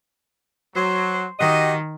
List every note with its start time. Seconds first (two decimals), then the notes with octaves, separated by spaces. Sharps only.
0.75 F#3 C5
1.39 D#3 F#4 G4 D#5